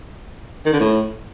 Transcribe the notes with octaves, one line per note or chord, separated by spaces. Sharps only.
D#3
D3
A2